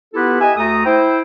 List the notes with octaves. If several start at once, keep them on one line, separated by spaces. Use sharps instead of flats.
B3 E4 F4 G4 A4 B4
G4 D#5 E5 G#5
D2 A3 A4 A#5 D#6
E4 C5 G5